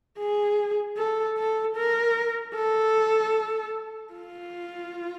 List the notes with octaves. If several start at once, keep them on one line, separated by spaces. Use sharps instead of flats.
G#4
A4
A4
A#4
A4
F4